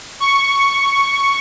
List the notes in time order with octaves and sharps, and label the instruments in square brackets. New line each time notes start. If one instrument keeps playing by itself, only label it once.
[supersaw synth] C#6